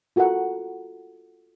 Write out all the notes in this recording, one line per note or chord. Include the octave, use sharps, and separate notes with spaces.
F4 F#4 A4 A#4 F#5